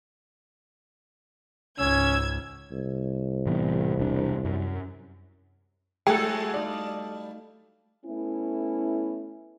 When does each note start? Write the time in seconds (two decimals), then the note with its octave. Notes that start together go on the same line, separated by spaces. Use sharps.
1.79 C#2 G#2 C#4 E6 G#6
2.72 C2
3.46 A2 E3 B3
3.98 E1 D4
4.45 F#2
6.07 F#3 G3 A3 E4 F#4 G#4 A4 G5
6.54 D#4 D5 F5 D#6
8.05 A3 B3 C#4 E4